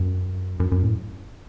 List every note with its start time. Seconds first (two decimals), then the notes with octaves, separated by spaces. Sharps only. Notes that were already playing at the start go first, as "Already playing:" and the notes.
Already playing: F#2
0.60 F#2
0.72 F#2
0.83 A2